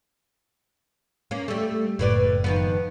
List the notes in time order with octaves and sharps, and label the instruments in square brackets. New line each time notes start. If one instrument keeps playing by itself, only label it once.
[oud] A#3 C#4
G3 A3
[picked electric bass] F#1 [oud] A2 B4 D5
[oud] D#3 F3 B3